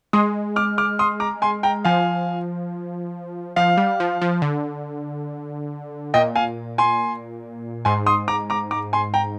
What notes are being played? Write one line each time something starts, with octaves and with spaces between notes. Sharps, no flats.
G#3 C6 D#6
D6 F6
D6 F6
C6 D#6
A#5 D6
G#5 C6
G5 A#5
F3 F5 G#5
F3 F5
G3
F3
F3
D3
A#2 D#5 G5
F5 G#5
G#5 C6
G#2 G#5 C6
C6 D#6
A#5 D6
A#5 D6
A#5 D6
G#5 C6
G5 A#5